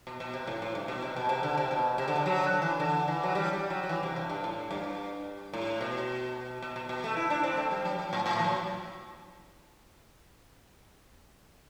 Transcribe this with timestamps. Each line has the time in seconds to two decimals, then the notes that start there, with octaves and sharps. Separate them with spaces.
0.07 B2
0.20 B2
0.34 C3
0.47 A2
0.62 A2
0.75 G2
0.88 B2
1.02 C3
1.16 B2
1.29 C3
1.43 D3
1.57 C3
1.71 B2
1.98 C3
2.08 D3
2.16 C3
2.26 F#3
2.43 D3
2.62 E3
2.80 D3
3.08 E3
3.23 F#3
3.35 G3
3.53 G3
3.70 F#3
3.83 F#3
3.89 E3
4.03 C3
4.16 G2
4.29 G2
4.44 A2
4.71 G2
5.53 A2
5.81 B2
6.62 B2
6.76 B2
6.89 B2
7.04 A3
7.17 E4
7.30 D4
7.43 C4
7.57 A3
7.71 G3
7.85 F#3
7.99 F#3
8.13 A2
8.26 A2
8.39 E3
8.44 F#3